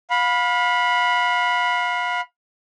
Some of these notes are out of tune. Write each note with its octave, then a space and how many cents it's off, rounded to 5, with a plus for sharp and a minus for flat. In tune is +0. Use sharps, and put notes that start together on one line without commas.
F5 +30 B5 -10